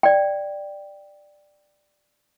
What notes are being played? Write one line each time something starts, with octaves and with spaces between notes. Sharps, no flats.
D5 G5